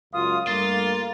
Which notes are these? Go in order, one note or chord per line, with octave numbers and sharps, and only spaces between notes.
C#2 F#2 F4 D#6
G2 A3 A#3 F4 A6